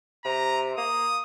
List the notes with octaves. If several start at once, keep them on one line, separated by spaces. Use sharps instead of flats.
C3 A#5
A#3 D#6